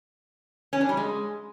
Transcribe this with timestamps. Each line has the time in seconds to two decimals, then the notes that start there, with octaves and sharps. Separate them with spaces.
0.73 C#4
0.81 D4
0.89 G3
0.97 G#3